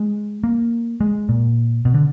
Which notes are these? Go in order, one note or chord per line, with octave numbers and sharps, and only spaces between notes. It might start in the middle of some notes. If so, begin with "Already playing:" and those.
Already playing: G#3
A#3
G#3
A#2
B2
D3